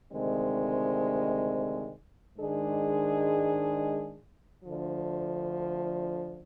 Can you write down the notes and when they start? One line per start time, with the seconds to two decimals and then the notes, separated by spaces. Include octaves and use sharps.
0.12 D2 C3 D#3 G#3 C4
2.38 G#2 D#3 G#3 D4 G#4
4.63 D2 D3 F3